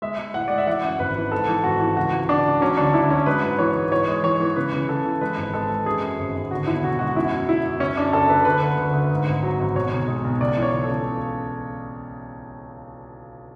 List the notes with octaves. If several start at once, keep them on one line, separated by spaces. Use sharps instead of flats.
G#3 E5
G#3
A2 F#5
G#3 D5
E5
E3 F#5
F#2
G#1 B4
E3
G#2 A4
E3
G#1 F#4
E3
C#2 F#4
C#2
C#2 D4
C#2
F#3 C#4
D2 D4
D2 E4
F#3 C#4
G#3 B4
G#2
E3 C#5
G#2
E3 C#5
G#3
E3 C#5
E3
C#3 B4
C#3
C#3 A4
E3
G#3 B4
G#1
G#3 A4
G#3
F#2 G#4
F#2
G#1
G#1
D3 F#4
E2 E4
E1 F#4
G#3 F#4
F#2 E4
F#3
F#2 E4
F#2
F#1 C#4
F#2 D4
F#1 A4
F#1 B4
D2 B4
D3
D2
D2
G#2
G#1
F#3
G#1
B1 C#5
B1
G#3
B1
C#2 D5
E3
C#5
C#2
A4
C#3